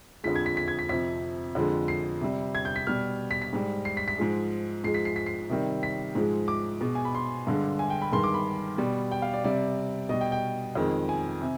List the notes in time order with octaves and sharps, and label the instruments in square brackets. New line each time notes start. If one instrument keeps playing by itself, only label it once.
[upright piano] F2 D3 F3 G#3 B6
G#6
B6
B6
G#6
B6
F2 C3 F3 B6
F2 D3 F3 G#3
C7
C3 G3
G#6
G6
B6
B2 G3 F6
B6
B6
G#2 G3
C7
B6
B6
G#2 F3 G#3
G#2 F3 G#3 C7
B6
C7
B6
C7
C3 D#3 G3
B6
G#2 F3 G#3
D6
B2 G#3
G#5
B5
C6
G2 D3 G#3
G#5
G5
B5
G2 D#3 G#3 C6
D6
B5
B2 G3
G5
F5
D5
C3 G3 D5
B2 G3 D#5
G5
G5
F2 D#3 G#3
G#5
C3